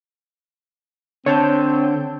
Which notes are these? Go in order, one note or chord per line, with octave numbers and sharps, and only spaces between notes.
D3 C4 C#5 A5 G6